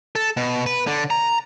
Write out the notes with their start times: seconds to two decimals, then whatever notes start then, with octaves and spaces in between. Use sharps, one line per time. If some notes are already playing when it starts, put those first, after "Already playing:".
0.15 A4
0.37 B2
0.66 B4
0.87 D3
1.10 A#5